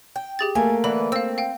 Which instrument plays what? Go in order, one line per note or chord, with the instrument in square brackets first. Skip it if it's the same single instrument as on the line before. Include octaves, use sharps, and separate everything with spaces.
[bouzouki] G5
[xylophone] G4 G#4 A6
[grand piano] A3 A#3 [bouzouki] G#5
[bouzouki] D3 E3 B4 [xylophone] B5
[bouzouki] C4 [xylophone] F5 E6
[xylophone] F5 G5